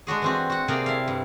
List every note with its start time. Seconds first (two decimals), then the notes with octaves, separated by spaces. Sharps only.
0.07 G#3 D4 F#4 G#4
0.22 E3 C4 F#4
0.50 F#4 F#5
0.68 C3 A#3 G#4 D5 F5 A#5
0.86 E4 A4 F5
1.08 G2